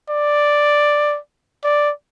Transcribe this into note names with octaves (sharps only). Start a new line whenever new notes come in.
D5
D5